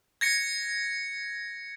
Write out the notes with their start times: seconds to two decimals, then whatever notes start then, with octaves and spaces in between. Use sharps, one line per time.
0.21 G#6 A#6 C#7